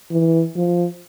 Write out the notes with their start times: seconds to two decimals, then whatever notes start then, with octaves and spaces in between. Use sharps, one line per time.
0.11 E3
0.56 F3